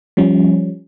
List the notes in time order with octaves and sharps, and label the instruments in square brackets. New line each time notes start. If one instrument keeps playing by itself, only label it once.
[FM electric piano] F3 G3 C#4